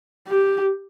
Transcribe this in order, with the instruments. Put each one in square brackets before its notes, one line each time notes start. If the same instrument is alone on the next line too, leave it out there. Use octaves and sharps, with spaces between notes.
[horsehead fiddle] G4